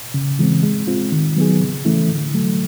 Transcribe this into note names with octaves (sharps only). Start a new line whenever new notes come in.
C#3
E3 G#3 C4
G#3
C4 F4
D#3
F#3 B3 D#4 G#4
C#3
E3 A3 C#4 E4
D3
F#3 A3